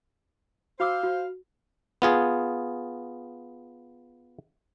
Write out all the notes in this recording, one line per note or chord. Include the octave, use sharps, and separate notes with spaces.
F#4 C5 F5 D6 E6
F#4
B3 F4 G#4